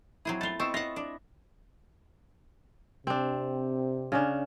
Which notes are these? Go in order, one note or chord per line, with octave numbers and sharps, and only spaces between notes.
F#3 C4 E4 G#4
A3 F4 A6 G7
C4 D#5 B5 C#6 E6 E7
F4 C#5 E5 F#5 A#6
D4
C3 C4 D4
C#3 C#4 D4